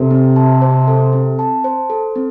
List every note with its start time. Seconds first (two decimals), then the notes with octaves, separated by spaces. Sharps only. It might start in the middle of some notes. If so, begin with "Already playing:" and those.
Already playing: C3 A4
0.11 C4
0.36 A5
0.62 C5
0.88 A4
1.13 C4
1.39 A5
1.64 C5
1.90 A4
2.16 C4